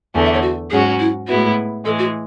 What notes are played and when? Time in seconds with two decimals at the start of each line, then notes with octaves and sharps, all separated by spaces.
0.15 E2 D3 A3 G#5
0.24 E5
0.34 C#5
0.42 F#4
0.71 G#2 F#3 C#4 F#4 G#4
1.00 E4
1.27 A2 G#3 B3 E4 F#4
1.84 A2 E3 G#3 A4
1.99 F#4